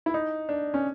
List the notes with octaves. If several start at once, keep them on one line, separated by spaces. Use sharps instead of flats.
E4
D#4
D4
C#4